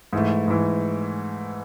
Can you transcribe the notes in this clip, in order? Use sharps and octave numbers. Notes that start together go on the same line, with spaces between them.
G#2 E3 A3
G#2 E3 A3